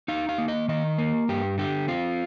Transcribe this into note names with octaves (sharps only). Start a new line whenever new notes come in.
D#4 F5
F5
A#3
D#5
D#3 D#5
A#3
G2 G4
D3 G4
C4 F4